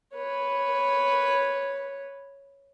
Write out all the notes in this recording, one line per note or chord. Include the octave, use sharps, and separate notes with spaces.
B4 C#5